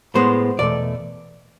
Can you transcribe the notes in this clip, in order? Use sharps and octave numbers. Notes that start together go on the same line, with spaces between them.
A2 G#3 B3 C5
E2 B2 A3 D5